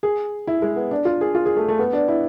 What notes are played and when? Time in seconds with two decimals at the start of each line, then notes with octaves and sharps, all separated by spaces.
0.03 G#4
0.47 E4
0.62 G#3
0.76 B3
0.91 D4
1.05 F4
1.21 G#4
1.35 F4
1.46 G#4
1.57 A3
1.68 A3
1.79 B3
1.93 D4
2.08 E4